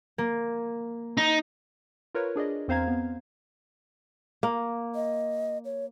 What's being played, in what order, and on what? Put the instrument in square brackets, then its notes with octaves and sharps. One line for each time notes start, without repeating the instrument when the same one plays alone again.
[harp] A#3
[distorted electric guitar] D#4
[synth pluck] F4 A#4 B4 C#5
D4 G#4 D5 D#5
E2 C4 C5 F5 A#5 G#6
B3
[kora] A#3
[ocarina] D#5
C#5